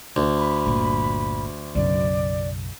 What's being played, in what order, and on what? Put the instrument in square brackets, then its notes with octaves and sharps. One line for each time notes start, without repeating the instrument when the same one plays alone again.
[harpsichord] D2
[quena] B5
[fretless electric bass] G1 A#2
[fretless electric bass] B1 F#2 C#3 [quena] D5